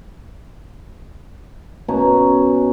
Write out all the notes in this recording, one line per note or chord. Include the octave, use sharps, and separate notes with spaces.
B2 C#4 A#5